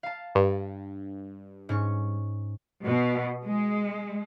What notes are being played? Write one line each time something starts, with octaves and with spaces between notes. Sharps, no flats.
F5 A5
G2
G#2 C#4 C#6
B2
G#3